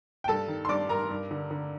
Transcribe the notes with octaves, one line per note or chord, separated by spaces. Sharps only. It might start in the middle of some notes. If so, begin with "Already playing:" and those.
G5
G2 A4 A5
D#3
C6
G2 D5 D6
G2 A#4 A#5
G2
D3
D3